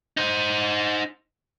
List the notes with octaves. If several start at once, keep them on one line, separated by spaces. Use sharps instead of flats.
D#4 C5